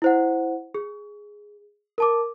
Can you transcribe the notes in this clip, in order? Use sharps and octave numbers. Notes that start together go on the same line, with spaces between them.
E4 C5 F#5
G#4
A#4 A5 D6